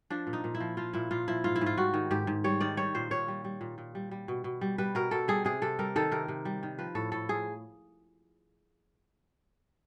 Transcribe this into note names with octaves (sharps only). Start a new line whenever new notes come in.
F3 D4
A#2
D#4
A#2
E4
F3
F3 F4
A#2 E4
A#2 F4
F3 E4
G#2 F4
E4
G#2
F4
G3 F#4
D#3
G#2 G4
G#2
G3 C#5
D#3 D5
G3 C#5
A#2 C5
A#2 C#5
G3
G3
A#2
A#2
G3
G3
B2
B2
G3
G3 B4
B2 A#4
B2 A4
G3 G#4
C3 G#4
C3 A4
G3 A#4
D#3 A4
C3 A#4
C3
G3
D#3
F3 B4
A2 A4
A2 A4
F3 G#4